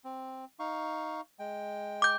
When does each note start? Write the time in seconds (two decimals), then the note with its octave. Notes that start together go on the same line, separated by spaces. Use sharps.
0.04 C4
0.59 D#4 F5 C#6
1.39 G#3 G5
2.02 D6 G6